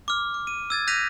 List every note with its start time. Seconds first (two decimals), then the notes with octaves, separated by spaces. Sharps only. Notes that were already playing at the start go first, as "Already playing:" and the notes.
0.08 D6 F6
0.34 D6
0.47 D#7
0.70 E6 G#6 A6
0.87 F#6 G6 A#6 B6 D#7 F7